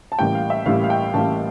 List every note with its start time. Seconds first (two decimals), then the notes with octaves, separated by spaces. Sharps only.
0.12 A5
0.19 A1 A2 G3 A#3 G5
0.35 F5
0.50 E5
0.66 A1 A2 G3 A#3 F5
0.84 F5
0.90 G5
1.14 A1 A2 G3 A#3 A5